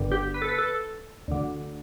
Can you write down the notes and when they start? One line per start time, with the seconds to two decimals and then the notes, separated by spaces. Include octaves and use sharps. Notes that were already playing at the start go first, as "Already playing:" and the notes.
Already playing: G1 G2 D3
0.12 G4
0.34 B4
0.42 A4
0.49 B4
0.59 A4
1.28 D2 D3